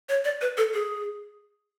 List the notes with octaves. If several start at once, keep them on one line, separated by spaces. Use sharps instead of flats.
C#5
D5
B4
A4
G#4